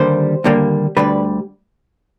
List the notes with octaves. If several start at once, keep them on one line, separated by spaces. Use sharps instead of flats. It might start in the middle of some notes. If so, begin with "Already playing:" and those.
Already playing: D#2 D3 G3 A#3 C5
D#2 D3 G3 A#3
D2 D3 G3 B4